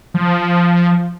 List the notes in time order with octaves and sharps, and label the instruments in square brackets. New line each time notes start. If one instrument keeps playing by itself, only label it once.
[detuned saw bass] F3